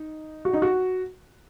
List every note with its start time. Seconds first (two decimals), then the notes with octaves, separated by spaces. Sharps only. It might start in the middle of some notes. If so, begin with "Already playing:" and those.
Already playing: D#4
0.45 F#4
0.53 D#4
0.62 F#4